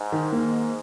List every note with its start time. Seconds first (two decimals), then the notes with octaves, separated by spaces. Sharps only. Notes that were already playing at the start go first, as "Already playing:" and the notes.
Already playing: G#2
0.12 D#3
0.32 A#3